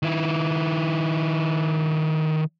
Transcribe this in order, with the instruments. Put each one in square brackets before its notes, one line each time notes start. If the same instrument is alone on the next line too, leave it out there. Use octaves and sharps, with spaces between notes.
[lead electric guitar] D#3 E4